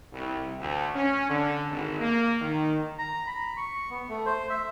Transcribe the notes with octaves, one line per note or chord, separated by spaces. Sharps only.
C2
D2
C#4
D3
G#1
A#3
D#3
A#5
B5
C#6
B3
A3
C5
E5